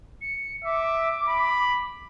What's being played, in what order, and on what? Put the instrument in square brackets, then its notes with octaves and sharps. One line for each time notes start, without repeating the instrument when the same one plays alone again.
[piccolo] C#7
[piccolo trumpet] E5 [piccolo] D6
[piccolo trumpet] B5